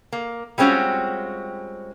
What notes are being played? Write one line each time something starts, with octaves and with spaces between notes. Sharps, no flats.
A#3
G3 G#3 C4 C#4 F4 F#4